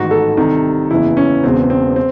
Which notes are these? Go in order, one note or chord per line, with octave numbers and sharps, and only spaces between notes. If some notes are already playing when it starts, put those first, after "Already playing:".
Already playing: A1 G#2 D#3 F#4
A4
C2 C3 D#3
F#1 E2 C#3 E3 E4
C#4
E1 E2 C#3 C4
C4
C4